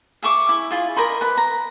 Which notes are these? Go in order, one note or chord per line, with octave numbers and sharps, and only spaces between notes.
G#4 E5 C#6 D6
E4
E4 F4 G#4
A#4 D#5 B5 C6
B4 B5
A#5